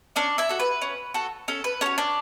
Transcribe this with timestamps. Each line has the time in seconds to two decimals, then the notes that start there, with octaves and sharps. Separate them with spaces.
0.16 C#4 D4 D5
0.38 E4 E5
0.49 F#4 A4
0.60 B4
0.82 C#4
1.14 F#4 A4
1.48 C#4 A4
1.64 B4
1.81 C#4 F#4 A4 C#5
1.98 D4 D5